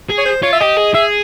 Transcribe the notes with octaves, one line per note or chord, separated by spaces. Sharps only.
G#4
C#5
C5
F4 C#5
E5
G4 D#5
G#4
G#4 E5